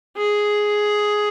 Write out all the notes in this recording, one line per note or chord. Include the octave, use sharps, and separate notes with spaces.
G#4